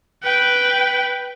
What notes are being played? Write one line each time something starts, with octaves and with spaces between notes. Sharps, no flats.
B4 G5